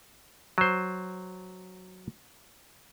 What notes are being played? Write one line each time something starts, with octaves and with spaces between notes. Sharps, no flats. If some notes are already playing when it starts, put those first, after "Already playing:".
F#3 C5